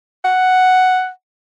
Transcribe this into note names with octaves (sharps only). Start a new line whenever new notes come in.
F#5